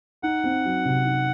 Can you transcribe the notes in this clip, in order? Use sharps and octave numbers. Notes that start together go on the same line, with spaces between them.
D#4 F#5
C4
F#3
C3
D#4